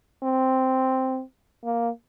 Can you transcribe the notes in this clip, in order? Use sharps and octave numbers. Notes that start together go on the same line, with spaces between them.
C4
A#3